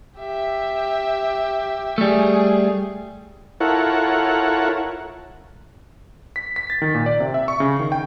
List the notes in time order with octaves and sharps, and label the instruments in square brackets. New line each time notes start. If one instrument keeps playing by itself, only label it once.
[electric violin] G4 E5
[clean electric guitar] G3 A3 [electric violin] G#4
[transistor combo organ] E4 F4 A4 A#4 C#5 F#5
[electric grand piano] B6
B6
A6
D#3
A#2
D5
C3
E5
C#6
C#3
D#3
G5